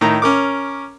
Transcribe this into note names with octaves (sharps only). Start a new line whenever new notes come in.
A2 D#3 A#5
C#4 A#4 D6